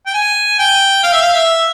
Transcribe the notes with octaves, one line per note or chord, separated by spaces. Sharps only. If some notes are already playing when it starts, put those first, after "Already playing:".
G5
G#5
G5
F5
E5
F5
E5